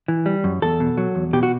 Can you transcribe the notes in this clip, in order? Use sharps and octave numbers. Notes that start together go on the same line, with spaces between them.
E3
G3
F#2
E2 A4
B2
F#3
E2
B2 G4
F#4